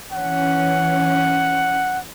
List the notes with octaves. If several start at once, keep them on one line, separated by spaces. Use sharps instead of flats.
E3 C#4 F#5